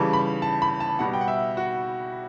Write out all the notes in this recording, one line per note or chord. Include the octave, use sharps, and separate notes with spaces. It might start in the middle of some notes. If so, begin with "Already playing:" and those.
Already playing: C#3 E3 G3 A5
B5
A5
B5
A5
B2 G3 F#5
G5
F#5
E5
F#4